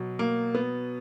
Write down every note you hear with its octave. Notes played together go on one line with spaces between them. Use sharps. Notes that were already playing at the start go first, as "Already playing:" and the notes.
Already playing: B2 F#3
A#3
B3